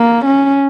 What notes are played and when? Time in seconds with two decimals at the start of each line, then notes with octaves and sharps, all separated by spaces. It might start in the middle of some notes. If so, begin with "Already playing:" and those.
Already playing: A#3
0.25 C#4